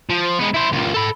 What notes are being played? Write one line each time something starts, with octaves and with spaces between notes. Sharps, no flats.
F3
G#3 B3
E4 C5
C#2 A#2
A4 B5